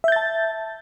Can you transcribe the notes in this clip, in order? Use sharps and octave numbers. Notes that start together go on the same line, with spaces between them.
E5 A5 G6 A6